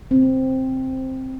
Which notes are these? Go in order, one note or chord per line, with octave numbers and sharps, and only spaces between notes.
C4